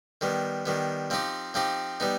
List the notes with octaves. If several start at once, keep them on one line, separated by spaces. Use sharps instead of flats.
D#3 G3 B3
D#3 G3 B3
F3 C4 D#4 G4
F3 C4 D#4 G4
G3 B3 D#4